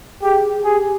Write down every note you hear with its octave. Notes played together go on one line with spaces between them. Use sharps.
G4 G#4
G4 G#4